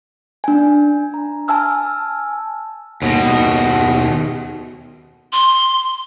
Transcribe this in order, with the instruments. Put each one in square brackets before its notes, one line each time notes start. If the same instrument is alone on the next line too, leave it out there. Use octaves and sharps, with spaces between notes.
[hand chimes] D4 G#5
A#5
G#5 A5 E6 F6
[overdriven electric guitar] D#2 B2
[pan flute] C6